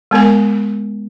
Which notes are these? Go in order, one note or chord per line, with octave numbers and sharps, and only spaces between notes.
G#3 B3 A#4 G#5